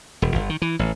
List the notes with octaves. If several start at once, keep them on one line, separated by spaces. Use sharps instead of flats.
E1
G1
D#3
E3
A1